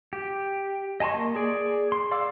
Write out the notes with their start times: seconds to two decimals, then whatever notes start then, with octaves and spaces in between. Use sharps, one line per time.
0.13 G4
1.00 D#5 G#5 A5 C6 C#6
1.13 A#3
1.36 G#4 D5
1.92 C6
2.11 D5 F5 C6 D6 E6